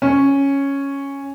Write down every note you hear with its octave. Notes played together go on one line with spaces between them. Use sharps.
C#4